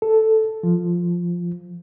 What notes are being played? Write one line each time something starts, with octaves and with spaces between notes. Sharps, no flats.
A4
F3